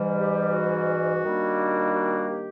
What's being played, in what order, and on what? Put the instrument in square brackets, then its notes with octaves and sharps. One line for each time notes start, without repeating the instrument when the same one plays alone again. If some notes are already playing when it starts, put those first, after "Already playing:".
Already playing: [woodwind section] G#2 E3 G3
G4
F#4
D#2 D#3 G3 A#3 D4
F#4
G4